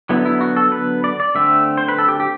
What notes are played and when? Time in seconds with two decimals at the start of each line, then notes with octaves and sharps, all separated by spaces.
0.09 D3 F#3 B3 E4
0.25 E4
0.41 F#4
0.57 A4
0.72 B4
1.04 D5
1.20 D5
1.35 D3 A3 C4 E5
1.78 C5
1.89 B4
1.99 A4
2.08 G4
2.20 G4